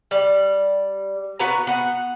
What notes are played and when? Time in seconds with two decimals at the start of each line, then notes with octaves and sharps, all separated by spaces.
0.11 G3
1.39 B3 F#4 B4 A#5
1.67 B3 F#5